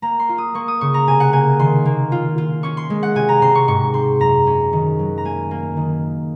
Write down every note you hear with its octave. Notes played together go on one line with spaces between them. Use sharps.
A#3 A#5
C6
F4
D#6
A#3 C#6
D#6
C#3 C#6
A#5
C3 G#5
F#5
A#3 G#5
D#3 C6
A#3
F4
F4
C#4 C#6
C6
G#3
F#5
C3 G#5
A#5
C3 C6
C#6
G#2 C#6
C4 C6
F#2 A#5
C#4
D#3
F#3
A#5
A#3 G#5
A#3
D#3